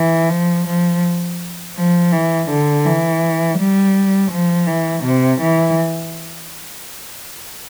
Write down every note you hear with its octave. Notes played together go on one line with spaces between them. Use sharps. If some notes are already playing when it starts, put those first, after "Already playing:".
Already playing: E3
F3
F3
F3
E3
D3
E3
G3
F3
E3
C3
E3